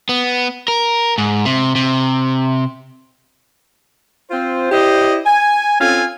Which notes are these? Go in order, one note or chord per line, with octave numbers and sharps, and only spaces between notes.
B3
A#4
G#2
C3
C3
C4 F4 C5
E4 G4 C5 D5 D#5
G#5
C4 C#4 F4 A4 G#5